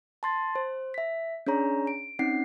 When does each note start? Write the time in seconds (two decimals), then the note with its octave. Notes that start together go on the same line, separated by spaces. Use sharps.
0.23 A5 C6 A6
0.55 C5
0.94 E5 B6
1.47 C#4 D4 G#4 C#5 A#5
1.87 D7
2.19 C4 C#4 D#4 F#5 C7